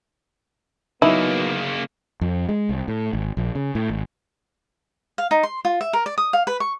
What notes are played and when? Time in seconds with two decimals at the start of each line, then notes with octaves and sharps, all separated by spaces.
1.02 C#3 F#3 A#3 B3 D#4 E4
2.21 F2
2.49 G#3
2.69 C2
2.88 A2
3.13 G#1
3.37 A#1
3.55 C#3
3.75 A2
3.90 G#1
5.18 F5
5.31 D#4
5.43 C6
5.65 F4
5.81 E5
5.93 A#4
6.06 D5
6.18 D#6
6.33 F5
6.47 B4
6.60 C#6